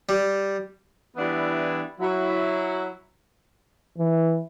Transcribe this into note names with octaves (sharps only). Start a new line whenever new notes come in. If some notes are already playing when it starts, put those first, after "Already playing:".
G3
E3 G3 B3 D4 E4
F#3 E4
E3